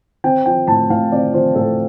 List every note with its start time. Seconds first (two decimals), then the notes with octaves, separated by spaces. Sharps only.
0.24 C4 G5
0.46 F3 G5
0.67 A2 A5
0.90 A2 F5
1.12 C4 D5
1.34 F3 C5
1.56 A2 A4